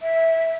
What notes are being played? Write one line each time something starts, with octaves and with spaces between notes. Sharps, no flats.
E5